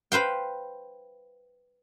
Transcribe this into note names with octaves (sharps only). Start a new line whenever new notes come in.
B4 C5 F5 G5